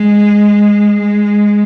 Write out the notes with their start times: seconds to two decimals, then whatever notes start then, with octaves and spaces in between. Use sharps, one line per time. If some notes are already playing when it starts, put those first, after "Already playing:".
Already playing: G#3
1.00 G#3